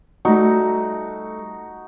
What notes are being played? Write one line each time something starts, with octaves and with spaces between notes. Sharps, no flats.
G3 A3 D#4 F#4